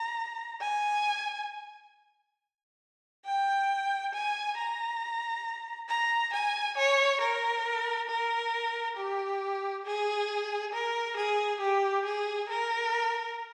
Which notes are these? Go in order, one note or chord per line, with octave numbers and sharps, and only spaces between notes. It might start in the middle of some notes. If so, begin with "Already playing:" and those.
Already playing: A#5
G#5
G5
G#5
A#5
A#5
G#5
C#5
A#4
A#4
G4
G#4
A#4
G#4
G4
G#4
A#4